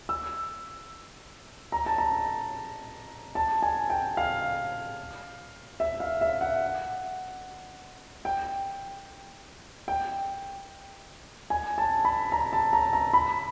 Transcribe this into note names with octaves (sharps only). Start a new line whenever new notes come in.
E6
A#5
A5
A#5
A5
G#5
G5
F5
E5
F5
E5
F#5
G5
G5
G#5
A5
B5
A#5
A5
A#5
A#5
B5